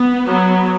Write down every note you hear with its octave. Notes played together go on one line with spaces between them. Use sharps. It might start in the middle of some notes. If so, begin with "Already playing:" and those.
Already playing: B3
F#3 B3